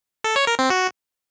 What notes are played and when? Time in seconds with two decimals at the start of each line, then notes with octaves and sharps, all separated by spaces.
0.24 A4
0.36 C#5
0.47 A#4
0.59 C4
0.70 F#4